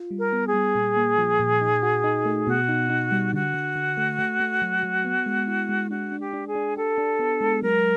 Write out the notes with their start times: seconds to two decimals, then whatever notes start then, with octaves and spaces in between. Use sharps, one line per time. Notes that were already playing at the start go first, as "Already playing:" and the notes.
Already playing: F4
0.11 G3
0.18 A#4
0.33 B3
0.47 G#4
0.53 G3
0.75 A#2
0.97 A#3
1.18 F3
1.40 A#2
1.61 D#4
1.83 F#4
2.04 D#4
2.25 A3
2.47 B2 F#4
2.68 D#4
2.90 D#4
3.12 G3
3.33 D3 F#4
3.54 D3
3.76 D3
3.97 A3
4.19 A3
4.40 A3
4.62 F#3
4.83 F#3
5.05 B3
5.26 G#3
5.47 E4
5.69 G#3
5.90 D4 F#4
6.12 D4
6.20 G4
6.33 D4
6.48 G#4
6.55 D4
6.77 G4 A4
6.98 D4
7.19 B3
7.41 G#3
7.62 F#3 A#4